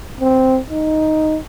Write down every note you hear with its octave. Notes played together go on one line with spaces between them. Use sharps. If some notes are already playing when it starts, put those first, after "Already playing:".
C4
D#4